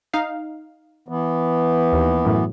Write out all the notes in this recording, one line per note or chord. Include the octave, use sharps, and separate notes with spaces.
D#4 F5
E3 B3
D#2
F#2 A2